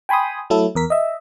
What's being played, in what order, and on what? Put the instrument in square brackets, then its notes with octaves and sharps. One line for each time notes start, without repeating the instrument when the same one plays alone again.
[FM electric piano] G5 G#5 B5 C6 D#6
F#3 A3 E4 A4
E2 A#4 B6
D#5 E5